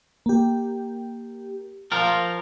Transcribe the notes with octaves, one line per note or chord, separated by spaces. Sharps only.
A#3 G4
F3 F4 A#4